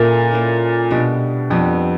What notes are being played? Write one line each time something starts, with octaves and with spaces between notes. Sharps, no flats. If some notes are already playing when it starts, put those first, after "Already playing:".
Already playing: A#2 A#3 C#4 E4 A4
A#3 C#4 E4 A4
B2 G3 B3 D4
F2 G3 B3 D4